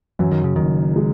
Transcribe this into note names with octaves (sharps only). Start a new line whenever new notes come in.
F#2 E3
D#3
C#3
F#1 D#3
G#3